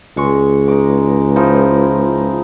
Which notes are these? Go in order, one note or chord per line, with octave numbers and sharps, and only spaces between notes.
C#2 G#3 C#6
D#4 D6
F3 D#4 E4